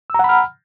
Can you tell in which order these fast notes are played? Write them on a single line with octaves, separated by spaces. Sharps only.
E6 A#5 F#5 B5 F6